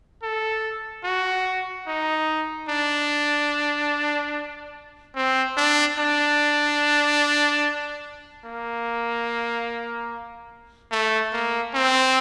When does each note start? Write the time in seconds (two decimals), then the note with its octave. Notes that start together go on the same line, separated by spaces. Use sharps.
0.23 A4
1.04 F#4
1.87 D#4
2.69 D4
5.15 C4
5.57 D4
5.98 D4
8.45 A#3
10.91 A3
11.33 A#3
11.74 C4